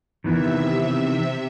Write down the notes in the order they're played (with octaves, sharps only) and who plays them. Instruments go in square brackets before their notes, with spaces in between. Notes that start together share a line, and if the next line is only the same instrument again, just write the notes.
[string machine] C3 E5 [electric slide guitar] D#3 E3 B3